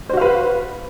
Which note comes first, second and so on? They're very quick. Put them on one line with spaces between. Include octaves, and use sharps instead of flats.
C5 F#4 F5 B4